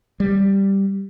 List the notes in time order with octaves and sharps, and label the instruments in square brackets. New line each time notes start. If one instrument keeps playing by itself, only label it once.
[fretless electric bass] G3